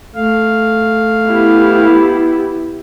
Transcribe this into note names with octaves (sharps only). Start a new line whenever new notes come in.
A3 F5
B3 E4 G4